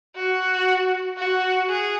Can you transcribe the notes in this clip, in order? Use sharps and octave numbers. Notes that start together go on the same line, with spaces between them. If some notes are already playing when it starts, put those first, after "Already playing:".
F#4
F#4
G#4